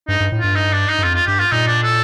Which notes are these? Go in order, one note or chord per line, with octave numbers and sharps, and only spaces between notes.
G2 D#4
G2
A2
G2 F4
D#4
D4
D#4
G2
F2 F4
F4
G2 G4
F4
A#2 D#4
D4
A4